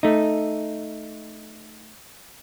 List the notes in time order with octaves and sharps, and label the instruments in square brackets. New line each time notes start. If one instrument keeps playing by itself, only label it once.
[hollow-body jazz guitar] A3 D#4